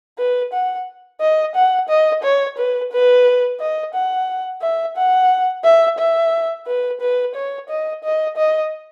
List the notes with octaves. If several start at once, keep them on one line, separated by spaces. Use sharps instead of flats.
B4
F#5
D#5
F#5
D#5
C#5
B4
B4
D#5
F#5
E5
F#5
E5
E5
B4
B4
C#5
D#5
D#5
D#5